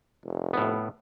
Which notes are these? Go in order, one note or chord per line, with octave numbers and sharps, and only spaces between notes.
F1
A2 B3